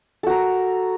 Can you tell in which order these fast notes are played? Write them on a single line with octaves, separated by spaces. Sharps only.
A4 F#4 A#4